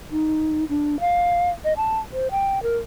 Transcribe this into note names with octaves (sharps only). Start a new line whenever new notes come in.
D#4
D4
F5
D#5
A5
C5
G5
A#4